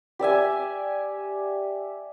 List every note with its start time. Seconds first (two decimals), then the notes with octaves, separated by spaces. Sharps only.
0.19 G4 D5 E5 G#5